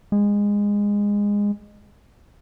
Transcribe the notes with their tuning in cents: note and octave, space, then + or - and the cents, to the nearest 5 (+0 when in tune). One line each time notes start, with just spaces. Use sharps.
G#3 -20